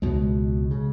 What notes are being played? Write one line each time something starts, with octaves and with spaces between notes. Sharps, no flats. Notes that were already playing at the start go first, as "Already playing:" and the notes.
C#2 B2 G#3
C#3